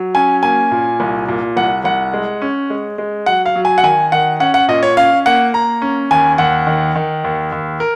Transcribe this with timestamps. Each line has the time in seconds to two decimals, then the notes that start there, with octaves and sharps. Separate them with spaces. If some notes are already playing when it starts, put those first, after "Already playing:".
Already playing: F#3
0.15 C#4 G#5
0.43 A#3 G#5
0.71 A#2
1.00 C2
1.29 A#2
1.57 C2 F#5
1.84 C2 F#5
2.14 G#3
2.42 C#4
2.70 G#3
2.98 G#3
3.26 F#3 F#5
3.46 F5
3.56 F#3
3.65 G#5
3.78 F#5
3.83 D#3 G#5
4.12 D#3 F#5
4.40 C#4 F#5
4.54 F#5
4.68 A#2 D#5
4.83 C#5
4.97 C#4 F5
5.26 A#3 F#5
5.53 A#3 A#5
5.82 C#4
6.11 D#2 G#5
6.38 D#2 F#5
6.67 D#3
6.95 D#3
7.24 D#2
7.52 D#2
7.80 A#4